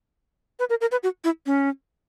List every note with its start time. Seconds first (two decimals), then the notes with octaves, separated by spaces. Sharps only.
0.59 B4
0.70 A#4
0.81 A#4
0.92 B4
1.03 F#4
1.24 E4
1.46 C#4